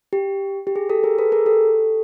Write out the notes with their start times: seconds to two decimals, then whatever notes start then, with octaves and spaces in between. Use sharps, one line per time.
0.13 G4
0.67 G4
0.76 G#4
0.90 G4 A4
1.04 G#4 A#4
1.18 A4 B4
1.32 G#4 A#4
1.46 G4 A4